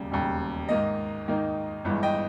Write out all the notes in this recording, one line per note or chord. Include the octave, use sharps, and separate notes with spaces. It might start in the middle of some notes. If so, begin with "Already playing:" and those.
Already playing: E1 D#2 C#3 G3
E1 D#2 C#3 G3
G#2 D#3 A#3 D#4 D#5
G#2 D#3 A#3 D#4
G1 G2 E3 G#3
D#5 G5